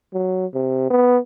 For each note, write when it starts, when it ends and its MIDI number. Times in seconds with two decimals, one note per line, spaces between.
0.14 0.46 54
0.54 0.88 48
0.90 1.18 59